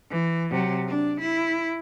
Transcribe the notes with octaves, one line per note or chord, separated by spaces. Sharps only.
E3
C3 F#3
D4
E4